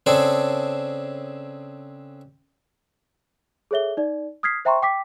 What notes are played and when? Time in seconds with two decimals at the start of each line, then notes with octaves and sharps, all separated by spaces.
0.06 C#3 C4 D4 G#4 A4
3.71 G#4 A4 C#5 E5 G7
3.97 D#4 D5
4.43 D#6 F6 G#6 B6 C7
4.65 C5 E5 G5 A#5 C6 C#6
4.82 G5 D6 B6